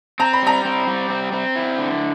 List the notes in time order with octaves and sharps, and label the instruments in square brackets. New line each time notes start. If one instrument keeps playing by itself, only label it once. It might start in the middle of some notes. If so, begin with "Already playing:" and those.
[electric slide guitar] C4 [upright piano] A#5
[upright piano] B5
[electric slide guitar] G3 [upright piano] A#5
[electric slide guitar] C4
G3
C4
C4
E4
D3